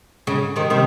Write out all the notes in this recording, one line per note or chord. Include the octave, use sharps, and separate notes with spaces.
C#3
C3 D#3
C3 D#3